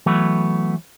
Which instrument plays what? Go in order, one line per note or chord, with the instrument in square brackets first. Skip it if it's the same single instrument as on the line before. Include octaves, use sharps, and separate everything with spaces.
[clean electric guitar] E3 F#3 A3 B3